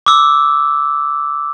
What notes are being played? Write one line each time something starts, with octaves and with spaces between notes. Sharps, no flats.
D6 E6